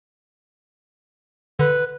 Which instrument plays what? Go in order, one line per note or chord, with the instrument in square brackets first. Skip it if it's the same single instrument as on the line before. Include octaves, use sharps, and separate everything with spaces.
[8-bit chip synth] D3 [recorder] B4